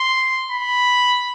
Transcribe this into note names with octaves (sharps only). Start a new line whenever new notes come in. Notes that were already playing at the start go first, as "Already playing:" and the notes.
Already playing: C6
B5